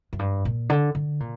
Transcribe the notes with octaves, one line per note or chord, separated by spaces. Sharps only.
F#2
G2
A#2
D3
D3
A#2